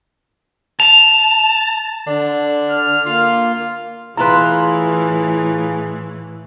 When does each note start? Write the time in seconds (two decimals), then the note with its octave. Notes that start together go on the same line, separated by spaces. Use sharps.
0.80 A5 F7
2.07 D3 D4
2.71 F6
3.06 A#3 F4
4.17 A2 E3 E4 F4 G#4 B4 A#5 C6